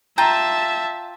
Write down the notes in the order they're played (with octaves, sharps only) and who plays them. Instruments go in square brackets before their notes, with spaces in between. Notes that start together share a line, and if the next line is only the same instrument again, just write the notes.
[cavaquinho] F4 G5 A#5 [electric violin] E5 A5